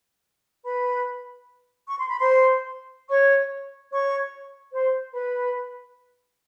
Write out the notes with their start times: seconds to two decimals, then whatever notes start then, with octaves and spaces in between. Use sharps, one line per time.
0.64 B4 B5
1.87 C#6
1.98 C6
2.08 B5
2.20 C5 C6
3.09 C#5 C#6
3.91 C#5 C#6
4.72 C5 C6
5.13 B4 B5